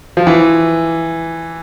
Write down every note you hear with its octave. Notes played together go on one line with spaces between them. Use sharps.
F3
E3